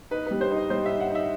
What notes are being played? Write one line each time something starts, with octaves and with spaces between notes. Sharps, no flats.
D#4 B4
G3 B4
C5
D#4 D#5
G3 C5
E5
D#4
F#5
D#4 E5